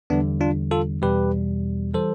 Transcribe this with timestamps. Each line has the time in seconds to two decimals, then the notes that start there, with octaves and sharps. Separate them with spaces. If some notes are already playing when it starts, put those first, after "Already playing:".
0.10 E2 D3 G3 B3 D4
0.41 D4 F4
0.71 F4 A4
1.02 E2 B2 G3 G4 B4
1.94 E3 G3 A4 C5